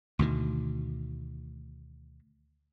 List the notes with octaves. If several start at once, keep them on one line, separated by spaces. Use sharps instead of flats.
D2 B2 D#3